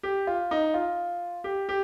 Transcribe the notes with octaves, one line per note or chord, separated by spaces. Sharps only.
G4
F4
D#4
F4
G4
G4